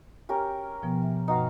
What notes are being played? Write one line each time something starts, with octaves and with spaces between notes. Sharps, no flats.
C#4 G4 A#4
B2 F3 B3
E5
G2 B2 D#4 F#4 B4 F5